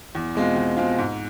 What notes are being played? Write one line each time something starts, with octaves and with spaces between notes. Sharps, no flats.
E2
B2 G#3 C4 F4
E2
B2 G#3 C4 F4
G#2